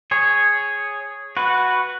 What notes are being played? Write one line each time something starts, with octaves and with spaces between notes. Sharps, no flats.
G#4 C#5
F#4 B4